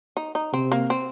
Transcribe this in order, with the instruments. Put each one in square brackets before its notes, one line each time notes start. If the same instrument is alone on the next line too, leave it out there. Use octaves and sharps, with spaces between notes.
[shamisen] D#4
D#4
[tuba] C3 [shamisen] C4
[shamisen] A#3
C4